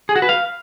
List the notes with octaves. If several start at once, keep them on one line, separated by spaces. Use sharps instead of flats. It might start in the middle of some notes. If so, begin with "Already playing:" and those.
G#4
F#4
B4
F5